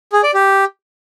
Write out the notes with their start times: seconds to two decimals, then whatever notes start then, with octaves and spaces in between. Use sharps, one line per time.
0.13 G#4
0.23 D5
0.34 G4